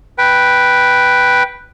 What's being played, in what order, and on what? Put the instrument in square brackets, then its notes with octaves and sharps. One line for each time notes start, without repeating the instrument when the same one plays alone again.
[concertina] B4 G5